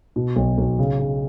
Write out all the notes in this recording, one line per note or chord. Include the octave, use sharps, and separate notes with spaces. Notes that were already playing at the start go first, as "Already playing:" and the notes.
B2
B1
B1
C#3
C#3